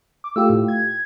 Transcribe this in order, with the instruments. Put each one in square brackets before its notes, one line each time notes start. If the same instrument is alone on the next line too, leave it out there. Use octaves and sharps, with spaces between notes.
[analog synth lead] D6
[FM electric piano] A3 F4 G4 [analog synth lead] E6
[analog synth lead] A2
G#6